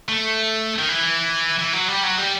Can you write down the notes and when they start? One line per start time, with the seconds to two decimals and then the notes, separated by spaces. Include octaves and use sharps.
0.09 A3
0.79 D#3
0.89 E3
1.59 E3
1.73 F#3
1.88 G3
2.03 F#3
2.18 G3